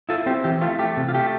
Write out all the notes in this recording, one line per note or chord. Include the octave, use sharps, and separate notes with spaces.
E4 F4 A4
C4 G4
E3 G4
A3 F4
A3 G4
C3
F4
A3 G4